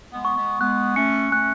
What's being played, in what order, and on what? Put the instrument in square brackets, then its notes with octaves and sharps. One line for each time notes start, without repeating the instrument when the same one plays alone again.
[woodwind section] G#3 B3
[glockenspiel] C#6
[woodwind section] G#3 B3
[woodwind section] G#3 B3 [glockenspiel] F#6
[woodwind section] A3 C#4 [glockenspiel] C#7
[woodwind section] A3 C#4 [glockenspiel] F#6